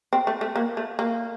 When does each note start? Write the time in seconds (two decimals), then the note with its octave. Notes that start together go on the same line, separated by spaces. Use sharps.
0.13 C4
0.27 A3
0.41 A3
0.56 A#3
0.77 A3
0.99 A#3